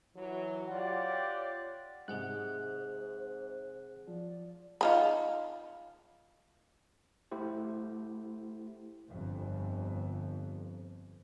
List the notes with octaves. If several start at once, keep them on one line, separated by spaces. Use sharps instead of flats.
E3 F#3
F4 G4 C#5 D5 F#5
G#2 C3 G#4 C5 F#5 F#6
F3 D5
D#4 F4 B5
A3 E4 G4 C5
G1 F2